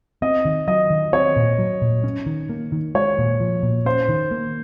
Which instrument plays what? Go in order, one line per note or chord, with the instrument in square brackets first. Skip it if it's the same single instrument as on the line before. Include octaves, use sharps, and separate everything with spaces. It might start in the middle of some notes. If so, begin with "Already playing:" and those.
[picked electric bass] C4 [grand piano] D#5
[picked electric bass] D#3
[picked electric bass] F#3 [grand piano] D#5
[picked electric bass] D#3
[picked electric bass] C4 [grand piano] C#5
[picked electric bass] A#2
F#3
A#2
C#4
D#3
A#3
D#3
[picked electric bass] G#3 [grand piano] C#5
[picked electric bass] A#2
F3
A#2
[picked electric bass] C#4 [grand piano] C5
[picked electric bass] D#3
A#3